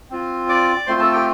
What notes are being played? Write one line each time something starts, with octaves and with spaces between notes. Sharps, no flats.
C4 F4
D5 D6
A3 C4 F4 C5 C6
A4 A5
G4 G5